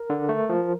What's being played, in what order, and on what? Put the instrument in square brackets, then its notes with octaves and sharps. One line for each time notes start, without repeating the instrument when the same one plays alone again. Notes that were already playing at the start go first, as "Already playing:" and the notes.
Already playing: [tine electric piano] A#4
D3
A3
F3